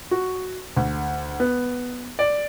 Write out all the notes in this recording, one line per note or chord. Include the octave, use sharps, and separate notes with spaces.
F#4
D2
B3
D5